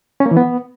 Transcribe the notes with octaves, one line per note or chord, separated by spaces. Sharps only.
C#4
A#3
E3
B3